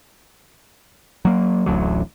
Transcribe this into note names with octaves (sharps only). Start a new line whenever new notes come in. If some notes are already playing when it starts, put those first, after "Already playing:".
F#3 A#3
D1 A1 D2 F#3